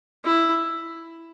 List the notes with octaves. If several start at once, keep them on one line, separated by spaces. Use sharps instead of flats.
E4